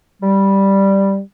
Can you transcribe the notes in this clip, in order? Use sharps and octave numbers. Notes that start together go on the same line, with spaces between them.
G3